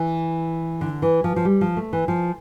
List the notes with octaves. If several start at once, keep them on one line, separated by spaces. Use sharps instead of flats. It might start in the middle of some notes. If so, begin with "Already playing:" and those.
Already playing: E3
D3
E3
F3
F3
G3
F3
A3
E3
F3